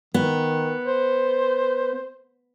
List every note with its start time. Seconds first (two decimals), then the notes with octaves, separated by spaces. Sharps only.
0.14 D#3 B3
0.84 C5